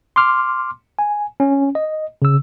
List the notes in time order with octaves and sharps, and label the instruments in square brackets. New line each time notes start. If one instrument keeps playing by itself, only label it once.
[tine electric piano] C6 D6 F6
G#5
C#4
D#5
C#3 E6